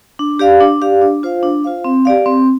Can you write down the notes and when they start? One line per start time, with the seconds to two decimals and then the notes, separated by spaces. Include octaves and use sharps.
0.19 D4
0.39 G4 D5 F5
0.61 D4
0.81 G4 D5 F5
1.02 D4
1.23 F4 C5 F5
1.43 D4
1.64 F4 C5 F5
1.85 C4
2.05 G4 D5 F5
2.26 C4